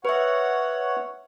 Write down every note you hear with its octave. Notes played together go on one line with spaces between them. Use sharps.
B4 C#5 E5 F#5